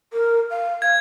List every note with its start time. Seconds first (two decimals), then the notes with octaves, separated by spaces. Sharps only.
0.13 A#4
0.50 F5
0.82 F5 G#6